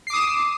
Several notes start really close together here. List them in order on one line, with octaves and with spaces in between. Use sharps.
C7 D6 D#6 E7